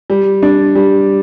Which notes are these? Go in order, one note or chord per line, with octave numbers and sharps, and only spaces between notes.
G3
D4
G3